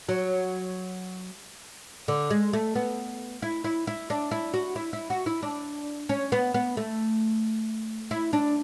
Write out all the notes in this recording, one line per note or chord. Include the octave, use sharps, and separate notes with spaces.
F#3
D3
G#3
A3
B3
E4
E4
E4
D4
E4
F#4
E4
E4
F#4
E4
D4
C#4
B3
B3
A3
E4
D4